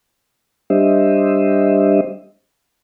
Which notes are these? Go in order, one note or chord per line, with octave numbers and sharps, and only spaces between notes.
G3 D4 G4 C5 D#5 E5